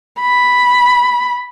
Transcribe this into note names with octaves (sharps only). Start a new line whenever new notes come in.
B5